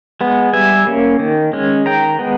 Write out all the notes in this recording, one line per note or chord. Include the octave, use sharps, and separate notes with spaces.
G#3 B3
G3 E5 G#5
A#3 C#4
D#3
G#3 C#4
D#3 G5 A#5
G#3 B3